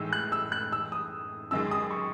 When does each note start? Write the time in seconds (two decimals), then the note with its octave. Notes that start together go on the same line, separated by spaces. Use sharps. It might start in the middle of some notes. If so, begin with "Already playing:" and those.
Already playing: A2 E3 G#3 D#4 E6
0.13 F#6
0.32 E6
0.52 F#6
0.72 E6
0.92 D#6
1.51 F#2 D#3 G#3 E6
1.71 D#6
1.91 C#6